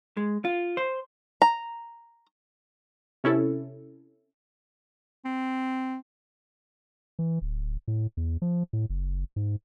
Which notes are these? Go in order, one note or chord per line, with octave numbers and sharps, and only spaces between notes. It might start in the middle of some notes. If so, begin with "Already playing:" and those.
G#3
F4
C5
A#5
C3 C#4 E4 A4
C4
E3
D1
A2
E2
F3
A2
F#1
G#2